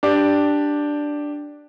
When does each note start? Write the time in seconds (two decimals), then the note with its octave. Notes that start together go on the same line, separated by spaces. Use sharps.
0.03 D4 G4 D5